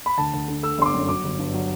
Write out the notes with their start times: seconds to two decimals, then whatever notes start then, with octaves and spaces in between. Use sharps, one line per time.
0.06 B5
0.18 D2 A5
0.34 D2
0.48 D3
0.63 A3 E6
0.79 G1 C6
0.86 D6
0.94 F#2
1.08 F#3 D6
1.24 G1
1.39 G2
1.54 F#3